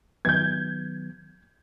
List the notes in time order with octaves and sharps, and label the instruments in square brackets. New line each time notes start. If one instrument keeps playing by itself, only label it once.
[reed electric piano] D#3 F#3 B3 [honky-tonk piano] G6 G#6